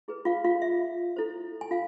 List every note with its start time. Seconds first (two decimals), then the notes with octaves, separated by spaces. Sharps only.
0.08 E4 G#4 B4
0.25 F4 F5
0.44 F4 F5
0.62 E5
1.16 E4 A4 C5
1.61 G#5
1.71 F4 F5